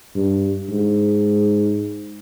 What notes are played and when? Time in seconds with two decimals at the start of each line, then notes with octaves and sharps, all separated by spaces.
0.15 G2
0.70 G#2